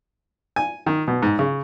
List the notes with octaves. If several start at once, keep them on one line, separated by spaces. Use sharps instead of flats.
G#5
D#3
B2
G#2
C#3